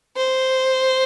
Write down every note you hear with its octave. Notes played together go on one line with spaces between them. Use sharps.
C5